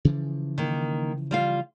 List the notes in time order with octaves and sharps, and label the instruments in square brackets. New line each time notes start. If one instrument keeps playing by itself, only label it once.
[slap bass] C#3 E3 F3
[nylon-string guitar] D#3 A#3
G3 F4 F5